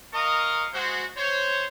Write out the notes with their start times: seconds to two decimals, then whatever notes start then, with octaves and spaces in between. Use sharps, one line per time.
0.12 A#4 D#5 F5 A#5 C#6 D#6
0.73 G#3 F#4 C5
1.16 C5 C#5